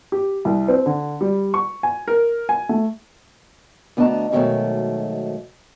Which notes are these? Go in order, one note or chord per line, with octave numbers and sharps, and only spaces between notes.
G4
C2
C4
D3
G3
C#6
G#5
A#4
G#5
A3
D2 B3 D4 D#5 A5 A#5
G#2 B2 D#3 E3 F#3 A3